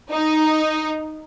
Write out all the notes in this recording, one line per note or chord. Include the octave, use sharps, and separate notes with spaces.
D#4